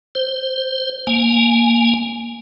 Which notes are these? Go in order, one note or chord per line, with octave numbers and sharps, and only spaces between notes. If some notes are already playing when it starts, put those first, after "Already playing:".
C5
A#3 G#5